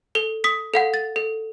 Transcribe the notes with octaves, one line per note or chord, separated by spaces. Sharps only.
A4 G7
D#6 B6
A4 F5 F#5
A6
A4